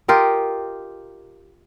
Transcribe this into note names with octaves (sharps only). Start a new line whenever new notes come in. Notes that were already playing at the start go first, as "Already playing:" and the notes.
F4 G4 A#4 D#5